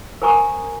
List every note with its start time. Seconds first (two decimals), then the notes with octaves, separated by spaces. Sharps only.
0.22 A#4 C5 G#5 A#5 C#6 D#6